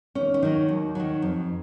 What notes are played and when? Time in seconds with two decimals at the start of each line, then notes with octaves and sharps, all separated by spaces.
0.15 D#2 C#4
0.34 C#4
0.42 D#3 F#3 D#4
0.69 D#2
0.95 D#3 F#3
1.22 F2